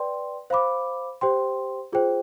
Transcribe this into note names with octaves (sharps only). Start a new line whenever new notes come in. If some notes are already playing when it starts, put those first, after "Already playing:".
Already playing: B4 D5 G5 C6
C5 F5 B5 D6
G4 C5 G5 C6
F4 G#4 C5 G5